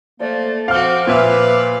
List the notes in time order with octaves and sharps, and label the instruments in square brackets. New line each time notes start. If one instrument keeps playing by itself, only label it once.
[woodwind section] F3 A#3 D5 [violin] A3
[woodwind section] F3 D6 [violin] C4 F#4 [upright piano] F5 F6
[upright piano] A#2 E5 [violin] B4 F5